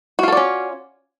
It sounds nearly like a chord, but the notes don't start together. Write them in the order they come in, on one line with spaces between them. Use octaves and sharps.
F#4 F4 A4 D5 C#4